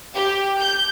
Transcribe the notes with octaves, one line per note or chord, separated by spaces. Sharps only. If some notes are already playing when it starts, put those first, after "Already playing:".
G4
G6